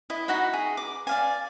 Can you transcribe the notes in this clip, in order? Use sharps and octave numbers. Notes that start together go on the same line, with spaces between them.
E4 D#5
D#4 F#4 F#5 B5
G#4
D6
D5 F5 G#5